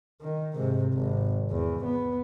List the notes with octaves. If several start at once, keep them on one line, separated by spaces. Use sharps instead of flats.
D#3
G#2 C3
G#1
E2
B3